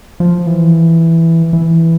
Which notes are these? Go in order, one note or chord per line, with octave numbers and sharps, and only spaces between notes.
F3
E3
E3